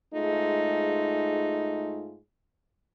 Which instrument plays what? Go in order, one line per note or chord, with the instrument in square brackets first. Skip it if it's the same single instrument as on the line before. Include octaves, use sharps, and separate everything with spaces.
[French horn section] G#2 G#3 A3 D#4 F4 G#4